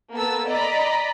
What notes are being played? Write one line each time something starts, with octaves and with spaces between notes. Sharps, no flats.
A#3 B3 A4 E6
D5 D#5 A#5 B5